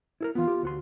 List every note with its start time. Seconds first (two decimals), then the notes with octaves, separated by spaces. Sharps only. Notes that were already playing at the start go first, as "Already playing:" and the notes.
0.21 E4 A4 A#4
0.35 E3 B3 F4
0.47 G4
0.63 D2 F#4 C6